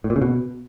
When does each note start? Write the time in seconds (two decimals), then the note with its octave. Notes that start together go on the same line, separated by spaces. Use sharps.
0.04 A2
0.10 A#2
0.16 C#3
0.22 B2